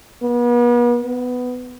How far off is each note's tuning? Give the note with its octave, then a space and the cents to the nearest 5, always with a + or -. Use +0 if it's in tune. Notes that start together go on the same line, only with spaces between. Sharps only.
B3 -40
B3 +10